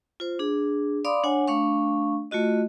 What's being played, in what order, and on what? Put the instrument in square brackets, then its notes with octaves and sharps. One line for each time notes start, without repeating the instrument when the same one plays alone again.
[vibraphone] F4 C5
D4 G#4
D5 F5 B5 C6 D6 D#6
D4 C#5 F#5 G#5
A3 D4 F5 C#6
A3 F4 F#4 D#5